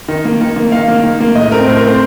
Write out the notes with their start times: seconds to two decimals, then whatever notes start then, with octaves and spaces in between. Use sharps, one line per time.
0.08 D#3
0.25 A#3
0.41 D#3
0.56 A#3
0.72 D#3 F5
0.88 A#3
1.04 D#3
1.20 A#3
1.35 A2 D#5
1.51 A3 C4 A#4
1.68 A2 C5
1.77 A#4
1.83 A3 C4 C5